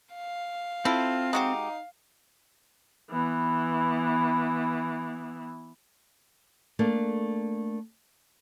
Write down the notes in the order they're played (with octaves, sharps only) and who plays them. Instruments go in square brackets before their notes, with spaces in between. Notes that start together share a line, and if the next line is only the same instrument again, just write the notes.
[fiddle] F5
[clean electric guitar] C4 [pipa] E4 A4 [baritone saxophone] F4
[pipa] G#3 F#4 G4 [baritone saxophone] D#4
[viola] E3 B3
[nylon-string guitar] A3 A#3 D4